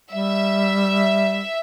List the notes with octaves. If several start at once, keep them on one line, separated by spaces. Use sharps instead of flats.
G3 E5